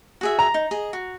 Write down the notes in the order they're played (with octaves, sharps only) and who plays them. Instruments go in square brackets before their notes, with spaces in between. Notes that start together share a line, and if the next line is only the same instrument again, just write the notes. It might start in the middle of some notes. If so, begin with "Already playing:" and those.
[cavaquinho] F#4 G#4 E5
[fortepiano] A#5
[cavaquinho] D#4
G#4 D#5
F#4